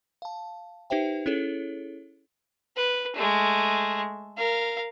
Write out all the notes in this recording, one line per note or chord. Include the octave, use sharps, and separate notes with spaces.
F5 A5
D#4 G4 B4 C5 E5 G5
C#4 E4 G#4 A4 C#5
B4
G#3 A3
A#4 F5